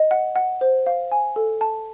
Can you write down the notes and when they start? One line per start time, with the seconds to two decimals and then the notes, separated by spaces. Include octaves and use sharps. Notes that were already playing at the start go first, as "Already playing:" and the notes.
Already playing: D#5
0.11 F#5
0.36 F#5
0.61 C5
0.86 F5
1.12 G#5
1.36 A4
1.61 A5